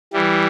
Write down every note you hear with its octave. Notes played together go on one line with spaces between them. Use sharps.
E3 G3